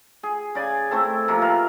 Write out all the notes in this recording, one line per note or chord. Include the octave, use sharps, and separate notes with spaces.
G#4
C#3 D5 G#5
A3 C4 E4 A4
C3 F3 A#3
A#4 B4 E5 F5